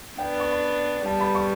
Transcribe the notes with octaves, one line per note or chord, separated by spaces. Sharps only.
B3 D4 G5
C#6
B5
G3 B3 A5
B5
C#6